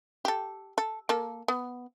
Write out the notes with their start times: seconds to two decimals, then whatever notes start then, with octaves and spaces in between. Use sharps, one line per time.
0.25 G4 A4
0.78 A4
1.09 A#3 A4
1.48 B3